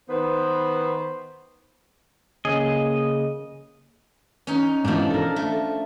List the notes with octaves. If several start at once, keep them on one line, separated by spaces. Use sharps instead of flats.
D#3 B3 B4 C5
C#3 A#3 G#4 D#5
C#4 D#4
G#2 B2 E3 F3 D4
A4 A#4
A3